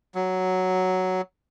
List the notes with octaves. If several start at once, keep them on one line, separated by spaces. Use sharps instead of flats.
F#3